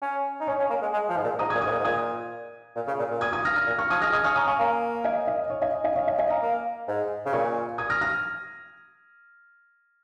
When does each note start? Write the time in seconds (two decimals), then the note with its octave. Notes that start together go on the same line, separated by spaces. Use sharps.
0.02 C#4
0.40 D#4
0.47 C#4 C#5
0.59 C#4
0.70 A#3
0.82 G#3
0.93 G#3
1.09 F3
1.17 G#2
1.24 A#2
1.39 G#2 A#5 D#6
1.50 D#6 G#6
1.54 A#2
1.62 D#6 G#6
1.65 G#2
1.70 A#2
1.79 G#2
1.85 A#2 D#6 G#6
2.76 A#2
2.87 C#3
2.98 A#2
3.10 A#2
3.21 D#6 G#6
3.33 D#6 G#6
3.45 F6 A#6
3.56 F6 A#6
3.67 A#2
3.79 C#6 F6
3.90 F3 D#6 G#6
4.01 G#3 F6 A#6
4.12 G#3 D#6 G#6
4.24 C#4 C#6 F6
4.35 C#4 A#5 D#6
4.47 C#4 G#5 C#6
4.59 A#3 F5 A#5
5.04 D#5 G#5
5.27 D#5
5.50 C#5
5.61 D#5 G#5
5.84 D#5 G#5
5.96 C#5 F5
6.07 D#5 G#5
6.18 D#5 G#5
6.30 F5 A#5
6.42 A#3
6.88 G#2
7.26 C#3
7.33 A#2 G#5 C#6
7.78 D#6 G#6
7.90 F6 A#6
8.01 F6 A#6